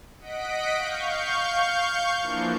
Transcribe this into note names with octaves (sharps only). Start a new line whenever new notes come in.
D#5 F#5 B6 D7
F5 C#6 G6
E3 F3 A#3 D4